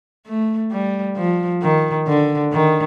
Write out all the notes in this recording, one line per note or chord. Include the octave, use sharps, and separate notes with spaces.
A3
G3
F3
D#3
D3
D#3